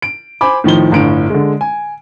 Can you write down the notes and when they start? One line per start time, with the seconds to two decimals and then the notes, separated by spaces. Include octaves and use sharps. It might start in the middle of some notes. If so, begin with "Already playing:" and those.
0.02 D7
0.41 C5 G#5 B5 D6
0.64 A2 D#3 F3 G7
0.92 G1 A2 D3 D7
1.30 D3 G#3
1.61 G#5